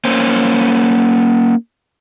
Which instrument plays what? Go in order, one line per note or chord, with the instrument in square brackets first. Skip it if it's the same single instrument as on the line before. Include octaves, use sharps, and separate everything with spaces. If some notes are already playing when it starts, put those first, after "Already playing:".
[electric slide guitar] A#3 C#4 C5